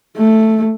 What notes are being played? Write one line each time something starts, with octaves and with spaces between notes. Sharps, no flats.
A3